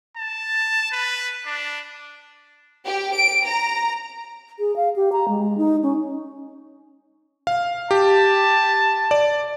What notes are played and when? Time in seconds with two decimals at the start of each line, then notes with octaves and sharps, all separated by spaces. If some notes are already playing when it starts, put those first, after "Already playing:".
0.17 A5
0.92 B4
1.46 D4
2.85 G4
3.15 D7
3.46 A#5
4.59 G#4
4.76 F5
4.96 G4
5.12 A#5
5.28 G#3
5.58 D#4
5.83 C#4
7.47 F5
7.91 G4 A5
9.11 D5